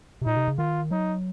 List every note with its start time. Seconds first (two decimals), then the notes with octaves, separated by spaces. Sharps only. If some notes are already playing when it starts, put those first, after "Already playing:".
0.22 C3
0.26 A#2 D#4
0.37 C3
0.48 C#3
0.58 D#3 F4
0.91 F#3 D#4